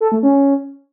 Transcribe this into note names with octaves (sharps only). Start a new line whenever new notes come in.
A4
A3
C#4